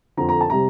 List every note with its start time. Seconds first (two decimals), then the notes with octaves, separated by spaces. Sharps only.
0.17 F2 D3 F3 A#5
0.29 A#5
0.41 A5
0.50 C3 G3 A#5